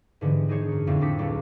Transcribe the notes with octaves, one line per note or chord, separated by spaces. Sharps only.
G#2 D3 E3 B3 G4
D4 D#4 G#4 C5 C#5
F#2 D#4
F2 A2 D3 C4 D4 D#4
D4 D#4 A4 D6 B6 C#7
C#2 F#3 G3 C4